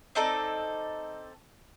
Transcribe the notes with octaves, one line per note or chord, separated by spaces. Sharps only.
C4 D#4 A4 D5